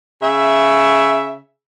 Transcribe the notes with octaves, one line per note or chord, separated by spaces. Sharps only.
C#3 E5